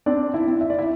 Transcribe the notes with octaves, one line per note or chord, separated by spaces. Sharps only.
C4 D4 D5
E4 E5
C4
E5
D5
E4 E5